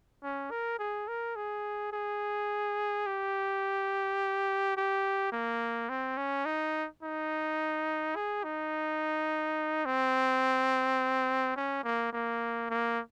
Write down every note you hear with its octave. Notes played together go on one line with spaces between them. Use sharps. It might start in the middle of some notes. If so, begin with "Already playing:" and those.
C#4
A#4
G#4
A#4
G#4
G#4
G4
G4
A#3
C4
C#4
D#4
D#4
G#4
D#4
C4
C#4
A#3
A#3
A#3